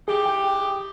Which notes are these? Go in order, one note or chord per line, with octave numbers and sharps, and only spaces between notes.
E3 D#4 G4 G#4
G5